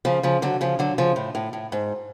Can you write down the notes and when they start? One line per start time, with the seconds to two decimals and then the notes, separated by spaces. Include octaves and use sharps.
0.05 C#3 F3
0.23 C#3 F3
0.42 D3 F#3
0.61 C#3 F3
0.79 D3 F#3
0.98 C#3 F3
1.16 A2
1.35 A2
1.53 A2
1.72 G#2